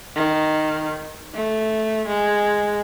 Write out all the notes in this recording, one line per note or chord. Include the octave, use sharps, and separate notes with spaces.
D#3
A3
G#3